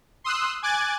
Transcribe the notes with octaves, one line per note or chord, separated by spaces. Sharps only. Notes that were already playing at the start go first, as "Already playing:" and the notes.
C6 D#6 E6 F#6
G#5 D6 F#6 G#6 A6